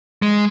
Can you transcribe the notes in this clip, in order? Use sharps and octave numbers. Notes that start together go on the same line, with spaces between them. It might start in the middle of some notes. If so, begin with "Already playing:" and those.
G#3